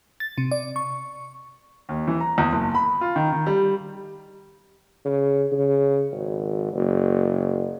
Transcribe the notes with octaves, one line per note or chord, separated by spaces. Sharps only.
A6
C3
D5
C#6
D#2
E3
A#5
E2
F#1
B5
F4
D#3
D#3
G3
C#3
C#3
G#1
F#1